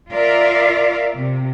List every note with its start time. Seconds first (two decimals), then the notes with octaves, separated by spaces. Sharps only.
0.12 F4 A#4 D5 E5 F5
1.16 C3